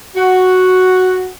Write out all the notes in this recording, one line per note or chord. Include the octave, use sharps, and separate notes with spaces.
F#4